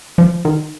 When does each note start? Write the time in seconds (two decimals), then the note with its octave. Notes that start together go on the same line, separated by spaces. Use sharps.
0.18 F3
0.45 D#3